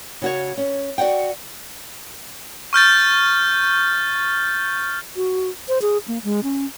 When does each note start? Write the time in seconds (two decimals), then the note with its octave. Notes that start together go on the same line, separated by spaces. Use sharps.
0.22 C#3 F#4 C#5
0.57 C#4
0.98 F#4 D5 F#5 G5
2.73 C#6 F6 G6 A6
5.16 F#4
5.68 C5
5.82 G#4
6.08 A#3
6.24 G#3
6.43 C#4